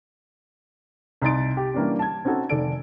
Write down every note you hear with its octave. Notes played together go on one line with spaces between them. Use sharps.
C2 D#4 C6 A6 D7
G4
E3 G3 A#3 C#4 D4
A5 G#6
C4 C#4 D#4 F#4 A4
F1 D#3 A4 D5 D7